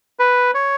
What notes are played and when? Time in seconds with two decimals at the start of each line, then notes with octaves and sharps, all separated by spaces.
0.19 B4
0.54 C#5